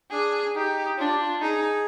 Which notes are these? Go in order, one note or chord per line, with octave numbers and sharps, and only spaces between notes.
D4 G#4
D#4 G4
D4 F4
G4
F4
D#4 G#4